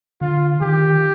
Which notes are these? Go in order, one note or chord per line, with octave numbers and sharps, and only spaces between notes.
D3 F4
D#3 G4